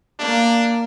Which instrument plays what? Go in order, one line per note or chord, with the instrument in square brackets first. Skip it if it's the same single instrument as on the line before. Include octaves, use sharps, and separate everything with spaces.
[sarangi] A#3 [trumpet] D4